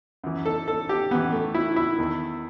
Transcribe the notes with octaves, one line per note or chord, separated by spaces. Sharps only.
F#2 E3
A4
A4
G4
F#2 E3 B3
A3
E4
E4
E2 D#3